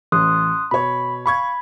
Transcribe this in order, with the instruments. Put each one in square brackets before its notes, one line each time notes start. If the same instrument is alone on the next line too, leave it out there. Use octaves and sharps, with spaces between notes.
[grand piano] A1 [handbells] C6 D#6 F#6
[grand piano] B2 C#5 [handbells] B5
[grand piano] F5 C#6 G#6 [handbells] B5